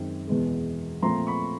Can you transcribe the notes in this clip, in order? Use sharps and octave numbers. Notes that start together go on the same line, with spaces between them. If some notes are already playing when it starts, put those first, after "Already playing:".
Already playing: F#2 D#3 G#3 C4
E2 B2 G#3
A#2 F3 A3 C4 A#5 C6
B5 C#6